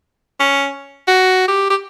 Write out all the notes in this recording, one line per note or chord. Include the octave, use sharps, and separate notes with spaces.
C#4
F#4
G4
G4